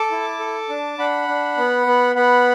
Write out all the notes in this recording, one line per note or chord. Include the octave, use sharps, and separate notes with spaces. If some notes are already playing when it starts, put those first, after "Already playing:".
Already playing: A4 A5 D6
E4
A4
D4
D4 F#5 B5
D4
B3
B3
B3 F#5 B5